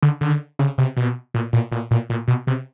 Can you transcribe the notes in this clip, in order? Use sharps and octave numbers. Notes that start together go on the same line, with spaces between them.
D3
D3
C#3
C3
B2
A#2
A#2
A#2
A#2
A#2
B2
C3